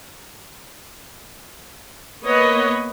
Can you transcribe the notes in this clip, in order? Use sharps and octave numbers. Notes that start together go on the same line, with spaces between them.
A#3 B3 B4 C#5 D#5